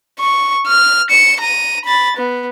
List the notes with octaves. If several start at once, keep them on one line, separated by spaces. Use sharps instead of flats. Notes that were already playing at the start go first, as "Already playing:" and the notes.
C#6
F6
C#7 E7
A#5 D#7
B5 A6
B3